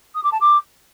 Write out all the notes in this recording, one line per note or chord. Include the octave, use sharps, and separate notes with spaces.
D#6
D6
A5
D6